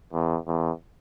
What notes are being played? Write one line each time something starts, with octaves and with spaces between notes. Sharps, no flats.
E2
E2